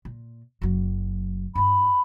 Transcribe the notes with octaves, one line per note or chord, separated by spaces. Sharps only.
A#2
F#1 F#3
G2 E4 B5